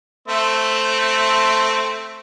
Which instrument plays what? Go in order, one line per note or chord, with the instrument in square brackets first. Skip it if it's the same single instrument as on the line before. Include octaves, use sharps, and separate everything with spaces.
[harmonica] A3 C4 E5